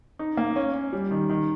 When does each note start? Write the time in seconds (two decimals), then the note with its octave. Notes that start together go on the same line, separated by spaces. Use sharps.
0.19 D#4
0.37 A#3
0.56 C#4
0.74 C#4
0.93 G3
1.11 D#3
1.29 D#3